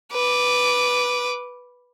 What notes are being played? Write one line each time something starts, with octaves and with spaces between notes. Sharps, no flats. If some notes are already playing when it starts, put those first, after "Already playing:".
B4 D6